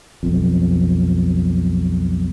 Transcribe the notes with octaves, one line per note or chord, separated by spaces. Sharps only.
B1 F2